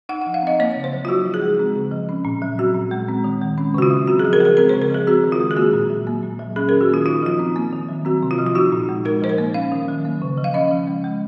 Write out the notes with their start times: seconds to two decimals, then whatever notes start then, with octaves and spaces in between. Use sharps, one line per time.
0.09 D#4 F#5
0.22 F#5
0.26 F3
0.34 F5
0.42 C4 D#5
0.60 A#3 C#5
0.76 C#3
0.84 C5
0.93 F#3
1.05 F4
1.09 D#4 F#4
1.25 F3
1.34 G#4
1.42 G#3
1.59 C4
1.76 C#3
1.92 F3
2.09 C#4
2.25 A#2
2.42 F#3
2.58 C4 F#4
2.74 A#2
2.91 G#3
3.09 C4
3.24 D#3
3.41 G#3
3.58 C#4
3.74 C#3 F#4
3.82 F4
3.90 F#3
4.07 C4 F#4
4.19 G#4
4.25 F3
4.33 A#4
4.40 G#3 G#4
4.45 A#4
4.57 C4 A#4
4.69 C5
4.74 C#3
4.82 A#4
4.90 F3 G#4
5.07 C4 F#4
5.24 D#3
5.32 F4
5.40 G#3
5.51 G#4
5.57 A#3 F#4
5.73 A#2
5.90 F#3
6.07 A#3
6.23 A#2
6.39 F#3
6.56 C#4 G#4
6.69 A#4
6.73 D#3
6.81 F#4
6.89 A#3 F4
7.06 D#4 F4
7.23 F3 F4
7.39 C4
7.56 A#3
7.73 D#3
7.89 F#3
8.05 C4 F#4
8.23 C3
8.31 F4
8.38 F3
8.46 F4
8.55 D#4 F#4
8.72 A#2
8.89 G#3
9.05 D#4 A#4
9.22 F3 C5
9.29 A#4
9.38 A#3
9.54 C#4 F5
9.72 D#3
9.88 F#3
10.05 A#3
10.22 C#3
10.38 F3
10.44 F5
10.54 C#4 D#5
10.71 F3
10.87 G#3
11.04 G#3